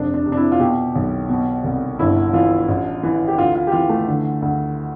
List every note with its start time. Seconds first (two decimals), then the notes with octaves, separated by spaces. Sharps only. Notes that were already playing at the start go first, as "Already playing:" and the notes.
Already playing: F1 D4
0.14 D4
0.26 C3
0.32 D4
0.37 E4
0.52 F4
0.60 B2 G4
0.95 B1
1.29 B2
1.64 C2
1.99 G1 E4
2.33 E3 F4
2.68 A1
3.03 E3
3.27 G4
3.37 D2 F4
3.55 F4
3.67 G4
3.72 E3 F4
3.89 A3
4.08 D3
4.42 D2